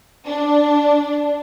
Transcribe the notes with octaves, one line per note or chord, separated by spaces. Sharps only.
D4